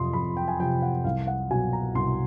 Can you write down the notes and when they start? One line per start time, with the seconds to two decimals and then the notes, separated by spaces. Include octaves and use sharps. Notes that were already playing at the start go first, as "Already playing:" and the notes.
Already playing: F2 C3 F3 C6 D#6
0.13 F2 B5
0.37 G5
0.48 G#5
0.59 C3 F3 G5
0.82 F#5
1.04 C2 F5
1.27 F#5
1.51 B2 F#3 G#5
1.73 A#5
1.95 C2 C6